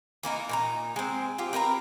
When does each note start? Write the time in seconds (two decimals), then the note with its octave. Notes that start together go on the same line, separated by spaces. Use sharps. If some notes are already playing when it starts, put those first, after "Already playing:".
0.23 E3 A#3 D#4 A#4
0.49 A#2 D#4 A#5
0.96 G#3 C4
1.38 F4 G4
1.53 C4 A#4 B4 A#5